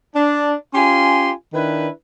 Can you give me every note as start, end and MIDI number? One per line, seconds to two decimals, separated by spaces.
0.16 0.52 62
0.74 1.32 61
0.74 1.32 65
0.74 1.32 67
0.74 1.32 80
0.74 1.32 84
1.53 1.89 51
1.53 1.89 62
1.53 1.89 64
1.53 1.89 71